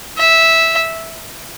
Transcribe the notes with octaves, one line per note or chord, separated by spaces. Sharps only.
E5